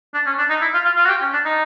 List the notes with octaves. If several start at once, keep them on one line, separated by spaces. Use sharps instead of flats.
D4
C#4
D4
D#4
E4
F4
F4
F4
F#4
G4
C#4
D4
D#4